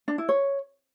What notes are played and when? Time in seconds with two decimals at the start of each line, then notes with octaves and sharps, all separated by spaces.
0.08 D4
0.18 E4
0.29 C#5